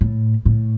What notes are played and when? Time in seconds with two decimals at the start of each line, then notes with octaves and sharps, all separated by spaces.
0.01 A2
0.45 A2